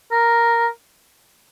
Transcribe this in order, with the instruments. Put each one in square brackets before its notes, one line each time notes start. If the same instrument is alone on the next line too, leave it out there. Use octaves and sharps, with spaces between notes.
[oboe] A#4